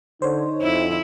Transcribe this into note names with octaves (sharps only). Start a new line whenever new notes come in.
D3 D#4 C5 C#5
F2 E4